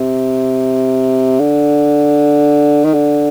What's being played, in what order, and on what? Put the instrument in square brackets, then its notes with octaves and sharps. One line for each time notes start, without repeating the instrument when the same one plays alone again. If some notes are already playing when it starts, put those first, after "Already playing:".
Already playing: [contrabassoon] C3
D3
D#3
D3